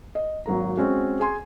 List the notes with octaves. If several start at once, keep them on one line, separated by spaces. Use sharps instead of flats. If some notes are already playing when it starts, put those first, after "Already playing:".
D#5
G#1 F#3 A#3 A#5
G#3 C4 C#4 F#4
G#4 G#5 C6